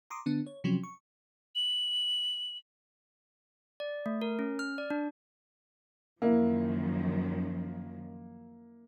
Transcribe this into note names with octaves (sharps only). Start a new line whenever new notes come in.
A#5 C6 D6 D#6
D3 B3 D4
C#5
C3 F3 F#3 C#4
C#6
F#7
D5
A3
A#4
C#4
F6
D5
D4
F#2 D#3 F3 A#3 E4